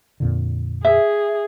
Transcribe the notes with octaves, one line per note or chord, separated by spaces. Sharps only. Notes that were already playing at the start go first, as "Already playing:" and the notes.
F2 A#2 D3
G#4 E5